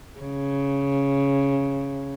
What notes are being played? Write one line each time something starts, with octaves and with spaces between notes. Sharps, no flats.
C#3